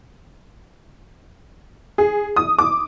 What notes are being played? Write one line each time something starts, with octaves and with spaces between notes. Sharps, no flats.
G#4
D#6
D6